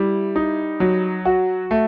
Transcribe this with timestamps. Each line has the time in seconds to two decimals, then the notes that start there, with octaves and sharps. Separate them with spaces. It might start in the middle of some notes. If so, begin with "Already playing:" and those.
Already playing: G3 E4
0.36 D#4
0.80 F#3
1.25 F#4
1.71 A3